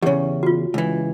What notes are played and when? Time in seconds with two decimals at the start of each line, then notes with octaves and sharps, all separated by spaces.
0.02 E2 C#3 G4 C#5
0.43 F4 F#4
0.74 C#2 E3